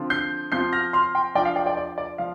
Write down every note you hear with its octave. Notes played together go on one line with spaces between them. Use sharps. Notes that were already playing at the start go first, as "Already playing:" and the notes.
Already playing: D3 F3 C4 F4
G6 C7
F3 C4 F4 G6 C7
F6 A#6
C6 F6
G5 C6
F3 D4 F4 D5 G5
F5
D5 G5
D5 G5
D5
D5
F3 F5